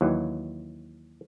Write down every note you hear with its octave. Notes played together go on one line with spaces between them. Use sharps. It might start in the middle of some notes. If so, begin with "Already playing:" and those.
D#2 E3 F#3